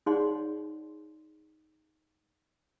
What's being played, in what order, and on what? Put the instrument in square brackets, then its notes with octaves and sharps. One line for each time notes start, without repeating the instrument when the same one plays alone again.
[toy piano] D#4 G#4 C#5 D5 F#5 C6